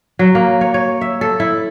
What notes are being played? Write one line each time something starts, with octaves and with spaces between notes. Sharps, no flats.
F#3
A#3
C#5
C#5
E5
A4
E4